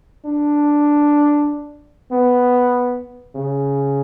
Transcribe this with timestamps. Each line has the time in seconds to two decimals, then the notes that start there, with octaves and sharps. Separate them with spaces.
0.25 D4
2.11 B3
3.35 C#3